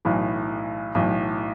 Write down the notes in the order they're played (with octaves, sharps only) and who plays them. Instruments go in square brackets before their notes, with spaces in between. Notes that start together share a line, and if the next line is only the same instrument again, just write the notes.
[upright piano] B1 A2 E3
B1 A2 E3